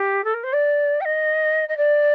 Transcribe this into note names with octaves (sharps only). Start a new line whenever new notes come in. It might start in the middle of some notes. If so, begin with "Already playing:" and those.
Already playing: G4
A4
A#4
C5
D5
G5
D#5
D#5
D5